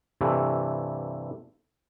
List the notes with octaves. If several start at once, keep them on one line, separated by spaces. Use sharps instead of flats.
G2 C3 E3 A3